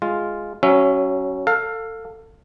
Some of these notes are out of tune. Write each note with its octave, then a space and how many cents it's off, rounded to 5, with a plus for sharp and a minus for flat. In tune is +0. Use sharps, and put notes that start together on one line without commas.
G#3 +0 F4 +0
F#3 +20 C#4 +0 E5 +20
A4 +25 F5 +15